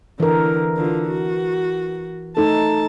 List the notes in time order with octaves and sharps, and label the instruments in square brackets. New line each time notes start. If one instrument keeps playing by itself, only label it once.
[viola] D3 [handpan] E3 A#4
[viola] D3 F4
F#4
[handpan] A3 D#4 A4 [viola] A5